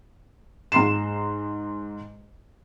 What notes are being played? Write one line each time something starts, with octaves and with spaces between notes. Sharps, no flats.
G#2 A#5 C6 C7 E7